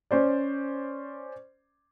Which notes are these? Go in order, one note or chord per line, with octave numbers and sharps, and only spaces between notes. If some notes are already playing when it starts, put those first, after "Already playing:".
C#4 C5 D5